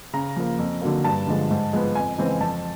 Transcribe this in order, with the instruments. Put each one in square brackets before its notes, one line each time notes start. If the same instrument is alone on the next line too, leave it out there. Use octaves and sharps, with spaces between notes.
[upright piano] C#3 A#5
F3 A#3
F2
D3 F#3 A#3
G2 A5
D3 F3 G#3
G#2
F3 G#3 B3
F2 G#5
C#3 E3 G#3 C4
F2 A5